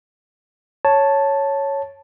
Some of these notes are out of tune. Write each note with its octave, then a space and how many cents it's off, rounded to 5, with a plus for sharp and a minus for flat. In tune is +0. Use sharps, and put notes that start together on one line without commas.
C#5 +0 A5 +0